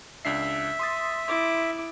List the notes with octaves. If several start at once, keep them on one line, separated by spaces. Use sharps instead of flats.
C#2 D4 E5 C7
C6 D#6 A6
E4 D6